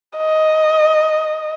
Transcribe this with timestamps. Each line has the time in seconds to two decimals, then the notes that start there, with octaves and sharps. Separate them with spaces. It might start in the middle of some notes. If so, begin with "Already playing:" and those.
0.17 D#5